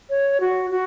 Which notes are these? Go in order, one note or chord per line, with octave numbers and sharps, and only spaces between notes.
C#5
F#4
F#4